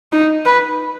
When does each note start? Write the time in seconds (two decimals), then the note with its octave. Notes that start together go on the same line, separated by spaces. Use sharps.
0.12 D#4
0.46 B4